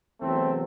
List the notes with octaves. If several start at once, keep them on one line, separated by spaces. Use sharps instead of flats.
E2 C3 F#3 A3 C4